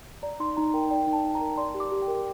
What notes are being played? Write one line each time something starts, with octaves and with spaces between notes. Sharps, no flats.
D5 A#5
D#4 C6
D#4 A#5
A#4 G5
D5 G5
D#4
A5
D#4
A#5
A#4
D5 C6
G4
D6
G4
G5
A#4